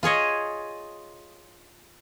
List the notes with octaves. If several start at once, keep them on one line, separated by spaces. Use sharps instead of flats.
F4 G#4 C#5 D#5